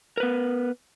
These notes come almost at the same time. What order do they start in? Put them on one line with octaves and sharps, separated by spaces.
A#4 B4 B3